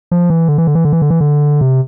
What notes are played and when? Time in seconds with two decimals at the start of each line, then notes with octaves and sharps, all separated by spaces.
0.11 F3
0.30 E3
0.48 D3
0.58 E3
0.67 D3
0.75 E3
0.85 D3
0.93 E3
1.02 D3
1.10 E3
1.21 D3
1.61 C3